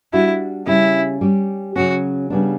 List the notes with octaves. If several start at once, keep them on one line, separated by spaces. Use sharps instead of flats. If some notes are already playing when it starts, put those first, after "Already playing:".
G3 D4 E4 F#4
C#3 G3 C#4 E4
G3 C#4 G4
C#3 F#3 C#4 F#4
C#3 G3 B3 D4